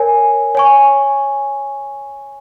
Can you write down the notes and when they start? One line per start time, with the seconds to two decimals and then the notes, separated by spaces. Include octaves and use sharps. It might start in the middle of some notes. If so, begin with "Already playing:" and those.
Already playing: A#4 C#5 G#5
0.55 C#5 G#5 C#6